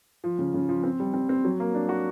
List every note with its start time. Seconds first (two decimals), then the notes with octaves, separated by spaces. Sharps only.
0.24 F3
0.39 C#3
0.54 C#3
0.69 F3
0.83 C4
1.00 G3
1.14 C4
1.29 C4
1.45 F#3
1.60 A#3
1.75 D4
1.89 F#4